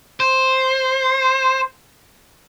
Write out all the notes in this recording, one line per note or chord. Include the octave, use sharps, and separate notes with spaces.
C5